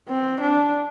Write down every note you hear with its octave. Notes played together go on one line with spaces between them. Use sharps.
C4
D4